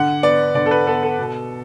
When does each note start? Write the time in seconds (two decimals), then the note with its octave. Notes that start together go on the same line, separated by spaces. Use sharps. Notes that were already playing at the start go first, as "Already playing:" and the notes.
Already playing: D3 F#5
0.23 B3 D5
0.55 D3 D5
0.66 A4
0.71 B4
0.87 B3 A4
1.03 A4
1.19 B2